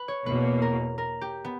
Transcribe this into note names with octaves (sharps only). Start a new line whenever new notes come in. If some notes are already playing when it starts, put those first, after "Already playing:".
Already playing: B4
C#5
E2 B2 A#3 B4
A#4
A#4
G4
B3